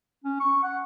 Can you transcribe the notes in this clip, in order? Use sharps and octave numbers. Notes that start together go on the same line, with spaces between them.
C#4
C#6
F#5